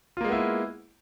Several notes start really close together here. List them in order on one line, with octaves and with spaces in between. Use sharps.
F4 A#3 G#3 B3 E4